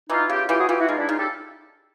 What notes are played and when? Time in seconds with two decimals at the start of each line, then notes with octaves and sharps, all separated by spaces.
0.10 E3 D#4 F4
0.29 C#3 F4 G4
0.49 E3 F4 G4
0.59 F#4 G#4
0.69 E3 F4 G4
0.79 E4 F#4
0.88 G#3 D#4 F4
0.99 D4 E4
1.09 C#3 D#4 F4
1.18 G4 A4